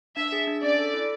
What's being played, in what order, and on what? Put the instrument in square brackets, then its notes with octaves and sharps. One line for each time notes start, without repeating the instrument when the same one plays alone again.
[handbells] D4 [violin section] E5
[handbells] G#4
D4
[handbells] C#4 [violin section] D5
[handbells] A4
E4